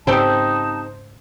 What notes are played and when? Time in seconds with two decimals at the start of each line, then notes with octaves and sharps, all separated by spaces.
0.07 G#2 C#3 C4 D#4 G4 A4 C5 A5